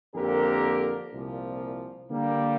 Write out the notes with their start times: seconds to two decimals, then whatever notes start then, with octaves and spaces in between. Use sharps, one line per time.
0.15 F2 D3 A#3 G4 A#4
1.13 C2 A#2 F3
2.10 D3 G3 A#3